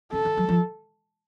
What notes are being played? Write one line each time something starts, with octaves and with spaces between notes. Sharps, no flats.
C#3 A4
D#3
F#3
F3